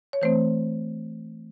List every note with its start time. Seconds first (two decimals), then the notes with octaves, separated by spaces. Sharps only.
0.13 C#5
0.22 E3 A3 C4 C5